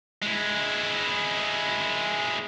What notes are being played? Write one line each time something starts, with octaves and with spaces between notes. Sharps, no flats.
G#3 E4